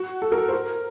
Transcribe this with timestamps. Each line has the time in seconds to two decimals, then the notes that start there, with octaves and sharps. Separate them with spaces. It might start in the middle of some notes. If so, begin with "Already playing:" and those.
Already playing: F#4
0.22 A4
0.32 A#4
0.38 A4
0.48 C5
0.53 A#4